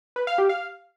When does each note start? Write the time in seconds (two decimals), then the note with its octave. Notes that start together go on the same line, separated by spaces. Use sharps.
0.16 B4
0.27 F5
0.38 G4
0.49 F5